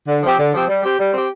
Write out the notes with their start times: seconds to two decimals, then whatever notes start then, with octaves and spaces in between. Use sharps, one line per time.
0.08 D3
0.22 F3 C4 G4
0.38 D3
0.54 F3 C4 G4
0.68 G3
0.83 C4 G4
0.99 G3
1.13 C4 G4